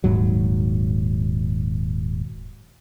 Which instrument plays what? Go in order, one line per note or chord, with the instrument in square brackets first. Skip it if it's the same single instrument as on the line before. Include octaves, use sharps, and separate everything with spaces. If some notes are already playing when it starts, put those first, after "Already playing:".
[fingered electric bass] D#1 G#2 F#3